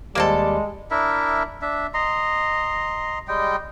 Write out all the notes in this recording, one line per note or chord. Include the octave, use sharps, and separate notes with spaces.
D#2 G3 G#3 A#3 C4 A4 D6
D4 E4 A#4 E5
D4 E5
D#5 A#5 C6
G3 G#3 D#5 G5